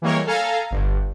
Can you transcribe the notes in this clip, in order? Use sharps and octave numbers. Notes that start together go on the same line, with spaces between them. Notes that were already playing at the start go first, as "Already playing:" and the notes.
E3 G3 G#3 A#3 A#4 C#5
A4 F5 G#5 A#5
G1 G2